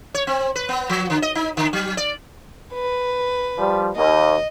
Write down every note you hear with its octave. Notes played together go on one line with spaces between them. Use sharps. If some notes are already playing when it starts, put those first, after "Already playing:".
C#5
C4
B4
B3
F3
D3
D#5
D#4
D3
F#3
D5
B4
F3 G3
D#2 D#5